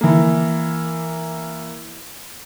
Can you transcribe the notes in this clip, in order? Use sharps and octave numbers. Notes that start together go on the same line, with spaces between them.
E3 A#3